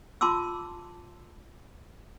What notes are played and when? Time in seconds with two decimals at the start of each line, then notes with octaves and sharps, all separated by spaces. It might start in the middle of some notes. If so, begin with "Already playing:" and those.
0.21 F4 A5 C6 D6 E6